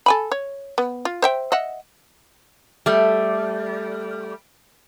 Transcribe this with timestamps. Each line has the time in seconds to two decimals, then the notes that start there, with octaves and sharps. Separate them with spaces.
0.06 A4 G#5 B5
0.32 C#5
0.78 B3
1.05 F4
1.22 C5 E5 G5
1.52 D#5 E5 F#5
2.86 G3 A3